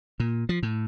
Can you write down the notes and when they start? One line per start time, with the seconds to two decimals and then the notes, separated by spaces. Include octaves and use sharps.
0.20 A#2
0.49 F3
0.63 A2